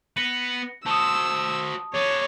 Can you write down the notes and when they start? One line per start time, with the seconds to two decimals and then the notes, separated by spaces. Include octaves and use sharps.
0.17 B3 B4 A#6 C#7
0.86 F#4 C5 A5 D#6 E6
1.94 G#4 C#5 D5